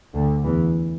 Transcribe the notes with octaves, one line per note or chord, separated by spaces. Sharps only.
D2 D3
E2 E3